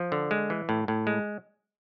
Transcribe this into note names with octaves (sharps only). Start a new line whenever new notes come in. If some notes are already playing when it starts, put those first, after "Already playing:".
Already playing: F3
D3
G#3
E3
A2
A2
G#3